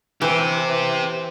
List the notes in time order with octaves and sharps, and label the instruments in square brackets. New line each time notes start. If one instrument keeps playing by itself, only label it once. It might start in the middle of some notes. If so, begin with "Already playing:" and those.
[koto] E3 [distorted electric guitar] G4 C5